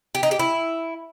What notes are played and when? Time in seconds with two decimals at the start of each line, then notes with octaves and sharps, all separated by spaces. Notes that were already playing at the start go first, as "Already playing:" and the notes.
0.15 G4
0.23 D#4
0.31 G4
0.39 E4